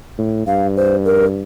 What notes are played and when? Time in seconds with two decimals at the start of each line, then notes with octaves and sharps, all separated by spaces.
0.18 A2
0.47 G2 F5
0.76 C5
1.05 A#4